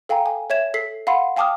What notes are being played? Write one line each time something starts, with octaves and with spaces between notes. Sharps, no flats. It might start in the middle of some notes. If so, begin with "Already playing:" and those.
A4 F5 G5 G#5 A#5
G#5
C#5 E5 G#6 E7
A4 B6 C7
F5 F#5 B5 C6
F5 G5 A5 D6 D#6 F6